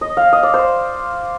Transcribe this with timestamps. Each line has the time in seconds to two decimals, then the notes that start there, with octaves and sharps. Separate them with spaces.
0.01 D#5
0.17 F5
0.33 D#5
0.43 D5
0.54 C5